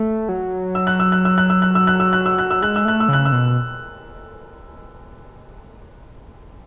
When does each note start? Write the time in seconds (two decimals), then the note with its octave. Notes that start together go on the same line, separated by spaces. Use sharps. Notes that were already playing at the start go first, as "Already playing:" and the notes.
Already playing: A3
0.29 F#3
0.75 E6
0.87 F#6
1.00 E6
1.12 F#6
1.25 E6
1.38 F#6
1.50 E6
1.62 F#6
1.75 E6
1.87 F#6
2.00 E6
2.13 F#6
2.26 E6
2.38 F#6
2.51 E6
2.62 G#3 F#6
2.76 E6
2.85 A3 F#6
3.00 E6
3.09 C#3 F#6
3.25 E6
3.32 B2